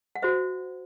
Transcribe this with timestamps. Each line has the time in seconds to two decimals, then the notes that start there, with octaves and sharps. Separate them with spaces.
0.15 F#5
0.22 F#4 C5 E5